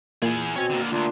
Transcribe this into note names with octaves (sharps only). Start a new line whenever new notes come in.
A#2 E3 G#4
B2 C4 C#5 G#5
D3 A#3
D2 D3 A#3 D4 F4